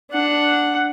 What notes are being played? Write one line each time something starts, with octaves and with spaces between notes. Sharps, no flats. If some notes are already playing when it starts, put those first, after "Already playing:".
D4 F#5